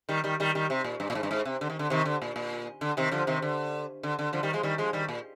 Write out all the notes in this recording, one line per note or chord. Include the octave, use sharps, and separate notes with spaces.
D#3 G3
D#3 G3
D#3 G3
D#3 G3
C3
A#2
G2
A#2
G#2
G2
G#2
C3
D3
D#3
D3
C3 D#3
D3
A#2
A#2
D3
C3 D#3
D3 F3
C3 D#3
D3
D3
D3
D3 F3
D#3 G3
F3 G#3
D#3 G3
F3 G#3
D#3 G3
A#2